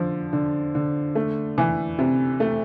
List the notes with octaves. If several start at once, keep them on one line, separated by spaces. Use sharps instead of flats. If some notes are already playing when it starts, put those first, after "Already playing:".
Already playing: D3 F3
D3
D3
A3
E3
C3
A3